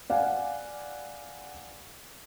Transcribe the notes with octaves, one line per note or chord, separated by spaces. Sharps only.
D5 F5 F#5 G#5